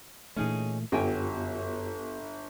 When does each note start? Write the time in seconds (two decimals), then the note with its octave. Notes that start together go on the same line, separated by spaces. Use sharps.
0.36 A#2 E3 A3 C#4 D#4 G#4
0.92 G1 F#2 F#3 B3 F4 G4 G5 G#5